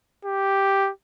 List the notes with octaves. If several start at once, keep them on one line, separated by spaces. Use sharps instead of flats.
G4